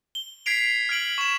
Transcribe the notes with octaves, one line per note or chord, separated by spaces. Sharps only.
G7
G#6 B6 C7 D7 F7
F6 G#6 D7 F#7
C#6 E7